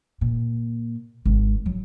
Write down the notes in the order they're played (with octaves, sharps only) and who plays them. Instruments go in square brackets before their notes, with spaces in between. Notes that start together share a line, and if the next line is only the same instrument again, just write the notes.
[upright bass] A#2
G#1
F#3